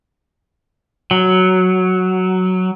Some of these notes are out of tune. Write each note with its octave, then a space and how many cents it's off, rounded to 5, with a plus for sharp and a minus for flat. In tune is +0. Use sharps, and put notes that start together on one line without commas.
F#3 +0